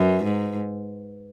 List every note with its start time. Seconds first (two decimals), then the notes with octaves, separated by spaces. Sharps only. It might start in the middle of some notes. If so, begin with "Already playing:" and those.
Already playing: F#2 B4
0.23 G#2